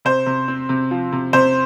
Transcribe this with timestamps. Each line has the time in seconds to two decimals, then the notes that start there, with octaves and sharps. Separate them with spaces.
0.05 C3 C5
0.26 C3
0.48 C4
0.69 C3
0.91 F3
1.12 C3
1.33 C3 C5